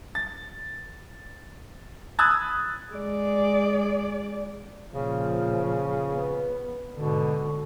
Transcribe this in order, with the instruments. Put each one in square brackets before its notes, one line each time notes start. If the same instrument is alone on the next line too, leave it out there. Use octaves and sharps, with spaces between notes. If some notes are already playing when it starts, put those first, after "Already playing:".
[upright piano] A6
B5 D#6 E6 F#6 G#6 A6
[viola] G#3 D5
[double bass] A#2 F3 [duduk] C#3
[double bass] B3
[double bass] G#2 D3 [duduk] B2